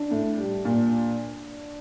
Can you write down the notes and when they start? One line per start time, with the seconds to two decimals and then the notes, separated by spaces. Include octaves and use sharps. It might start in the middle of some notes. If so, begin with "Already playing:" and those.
Already playing: D4
0.11 A2
0.37 G3
0.65 A#2